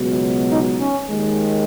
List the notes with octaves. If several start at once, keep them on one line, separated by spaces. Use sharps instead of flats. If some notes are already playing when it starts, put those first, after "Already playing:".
Already playing: C#2 B2 F#3
D#4
C#4
D#2 D#3 G#3